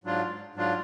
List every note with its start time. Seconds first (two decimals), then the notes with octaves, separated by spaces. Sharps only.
0.04 G#2 F#3 D4 F4
0.55 G#2 F#3 D4 F4